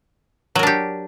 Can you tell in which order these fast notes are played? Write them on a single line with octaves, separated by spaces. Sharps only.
F#3 A#4 D4 G4